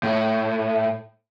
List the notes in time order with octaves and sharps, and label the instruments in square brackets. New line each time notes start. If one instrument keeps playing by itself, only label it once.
[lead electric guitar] A2